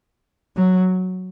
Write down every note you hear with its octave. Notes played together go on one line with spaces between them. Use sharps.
F#3